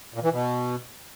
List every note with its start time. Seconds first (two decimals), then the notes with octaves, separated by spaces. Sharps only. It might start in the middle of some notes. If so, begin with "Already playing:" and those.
0.14 A#2
0.23 E3
0.32 B2